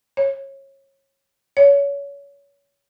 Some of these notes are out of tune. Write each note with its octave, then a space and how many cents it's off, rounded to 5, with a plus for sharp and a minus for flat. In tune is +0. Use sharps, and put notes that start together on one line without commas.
C#5 -25
C#5 +30